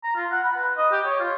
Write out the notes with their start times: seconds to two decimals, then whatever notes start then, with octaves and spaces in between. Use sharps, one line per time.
0.04 A#5
0.16 F4
0.31 F#5
0.44 B5
0.56 B4
0.77 D#5
0.92 G4
1.05 C#5
1.20 F4